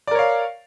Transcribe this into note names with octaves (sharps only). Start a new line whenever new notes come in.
A#4 C#5 D5 F5